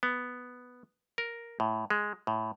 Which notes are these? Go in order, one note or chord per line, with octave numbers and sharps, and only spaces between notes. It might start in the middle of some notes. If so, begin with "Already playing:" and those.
B3
A#4
A2
G#3
A2